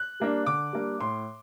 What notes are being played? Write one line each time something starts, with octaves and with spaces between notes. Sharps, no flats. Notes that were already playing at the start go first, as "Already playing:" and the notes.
Already playing: F#6
G3 A#3 D4
D3 D6
G3 A#3 D4
A2 C6